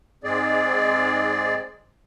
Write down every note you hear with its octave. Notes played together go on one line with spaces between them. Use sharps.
G#2 G#3 C4 G#4 D5